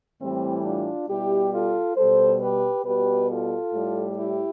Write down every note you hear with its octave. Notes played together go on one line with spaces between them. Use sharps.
A2 E3 G3 C4 E4
D4 F4
B2 G3 E4 G4
F4 A4
B2 G3 A4 C5
G4 B4
B2 G3 G4 B4
F4 A4
A2 G3
E4 G4